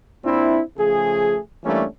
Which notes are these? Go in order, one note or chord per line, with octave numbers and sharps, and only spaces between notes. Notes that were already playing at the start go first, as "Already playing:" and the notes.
A#2 C4 D4 E4
C#3 F3 A3 G#4
E3 G3 A3 A#3 C#4 D4